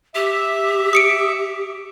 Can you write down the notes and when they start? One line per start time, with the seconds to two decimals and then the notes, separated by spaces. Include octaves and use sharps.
0.15 G4 E5
0.93 D#6 C#7 D7